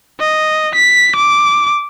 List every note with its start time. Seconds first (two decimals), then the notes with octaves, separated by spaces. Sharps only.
0.20 D#5
0.75 B6
1.16 D6